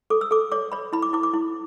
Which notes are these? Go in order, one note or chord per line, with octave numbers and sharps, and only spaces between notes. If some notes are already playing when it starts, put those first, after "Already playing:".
A4 D6
E6
A4 D6
C#5 D6
C#5 B5
E4 B5
D6
E4 D6
D6
E4